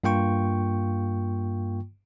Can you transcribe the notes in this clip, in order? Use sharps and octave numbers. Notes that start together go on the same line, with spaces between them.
G2 A#3 F4 G5 C#6